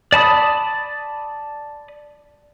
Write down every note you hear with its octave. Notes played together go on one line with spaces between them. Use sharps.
D5 A5 B5 D#6